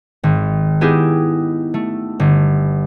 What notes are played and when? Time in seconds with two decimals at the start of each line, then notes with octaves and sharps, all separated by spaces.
0.24 G#1
0.81 B3 D#4 E4 G4 G#4
1.74 A3
2.20 G1